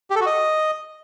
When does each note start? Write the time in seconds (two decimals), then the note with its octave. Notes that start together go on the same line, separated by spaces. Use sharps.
0.10 G4
0.16 A4
0.21 F#4
0.26 D#5